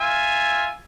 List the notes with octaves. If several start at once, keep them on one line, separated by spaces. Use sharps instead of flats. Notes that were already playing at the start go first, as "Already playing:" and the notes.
F4 E5 G#5